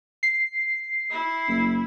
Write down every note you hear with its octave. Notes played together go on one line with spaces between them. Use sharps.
C7
E4
F#1